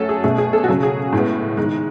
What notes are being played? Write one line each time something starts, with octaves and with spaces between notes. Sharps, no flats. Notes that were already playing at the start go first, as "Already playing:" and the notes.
Already playing: F#3 A3 C#4 A4
G#4
B2 A3 C#4 G#4
G#4
A4
F#4
C#3 F#3 C#4 G#4
G#4
A2 G#3 B3
G#2 D#3 G#3